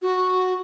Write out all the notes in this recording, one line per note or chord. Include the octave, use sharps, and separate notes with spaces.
F#4